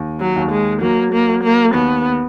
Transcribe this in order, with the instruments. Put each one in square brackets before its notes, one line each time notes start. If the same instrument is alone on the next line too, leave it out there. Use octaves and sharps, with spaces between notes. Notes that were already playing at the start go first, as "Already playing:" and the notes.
Already playing: [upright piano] D#2
[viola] F#3
[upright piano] D#2
[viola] G#3
[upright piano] F#3 [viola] A#3
[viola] A#3
[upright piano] F#3
[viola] A#3
[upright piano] D#2 [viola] B3